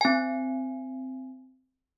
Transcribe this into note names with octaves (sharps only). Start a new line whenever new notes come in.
C4 G#5